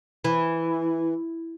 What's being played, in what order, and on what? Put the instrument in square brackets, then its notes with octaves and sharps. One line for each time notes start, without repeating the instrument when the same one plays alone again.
[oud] E3